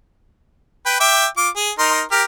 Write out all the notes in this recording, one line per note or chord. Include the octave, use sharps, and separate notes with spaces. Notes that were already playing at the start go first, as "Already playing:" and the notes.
B4 G5
E5 G5 D6
F4 D6
G#4
D#4 A#4 C6
G4 A#4 F6